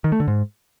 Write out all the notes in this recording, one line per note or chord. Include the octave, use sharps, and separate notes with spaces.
D#3
A3
D3
G#2